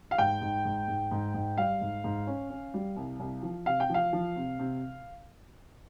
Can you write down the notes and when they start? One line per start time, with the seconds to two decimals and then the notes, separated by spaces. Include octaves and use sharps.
0.11 F5
0.18 G#2 G5
0.41 G#2
0.65 G#2
0.88 G#2
1.11 G#2
1.34 G#2
1.57 G3 F5
1.81 G#2
2.04 G#2
2.27 C#4
2.50 C#4
2.74 G3
2.97 C2
3.20 C2
3.43 F3
3.66 C3 F5
3.80 G5
3.90 F3 F5
4.13 F3
4.36 C3
4.59 C3